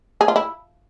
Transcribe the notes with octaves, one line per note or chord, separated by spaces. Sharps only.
G#4
F4
E4